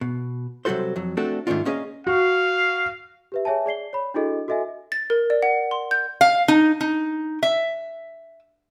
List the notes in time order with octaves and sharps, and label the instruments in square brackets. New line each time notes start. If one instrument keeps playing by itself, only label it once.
[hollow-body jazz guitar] B2
C3 F#3 G3 F#4 A4 C5
F2 F#3
A3 C4 D4 F#4 A4
G#2 D#3 A3 C#4 D4 F4
A#3 C#4 G#4 A#4 D#5 F5
[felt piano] F#4 [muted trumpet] F5
[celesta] G4 B4 E5
G#4 C#5 E5 G#5 A5
G#4 D5 C7 G7
C#5 B5
D4 E4 F#4 G#4 A4 D#5
F#4 A4 D#5 E5 G#5
[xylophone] A6
A#4
D5
F#5
C6
G6
[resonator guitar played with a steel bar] F5
D#4
D#4
E5